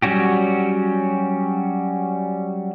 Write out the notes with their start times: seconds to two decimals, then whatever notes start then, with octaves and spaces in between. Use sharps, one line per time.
0.02 F#3 G3 C#4 F#4 G4